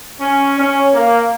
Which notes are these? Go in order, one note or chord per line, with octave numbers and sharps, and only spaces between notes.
C#4
C#4
A#3